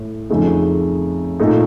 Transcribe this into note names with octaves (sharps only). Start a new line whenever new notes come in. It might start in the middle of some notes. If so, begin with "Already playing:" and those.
Already playing: A2 A3
F2 C#3 A3 D#4
A#2 A3 D#4